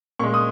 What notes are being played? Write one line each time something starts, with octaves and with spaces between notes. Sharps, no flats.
A#2 G#3 C#6
D#6